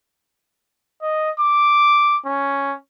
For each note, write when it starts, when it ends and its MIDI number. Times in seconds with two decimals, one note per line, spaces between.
1.02 1.30 75
1.40 2.17 86
2.26 2.73 61